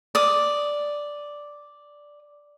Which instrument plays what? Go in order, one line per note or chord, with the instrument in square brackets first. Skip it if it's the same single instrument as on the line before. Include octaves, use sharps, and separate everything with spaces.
[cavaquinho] D5 D#6